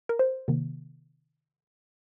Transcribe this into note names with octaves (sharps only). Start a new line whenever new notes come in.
A#4
C5
C3 D#3 A#3